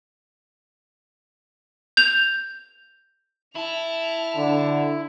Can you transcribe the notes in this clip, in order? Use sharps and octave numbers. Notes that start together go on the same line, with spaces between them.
G6 F7
E4 A5 F7
D3 D4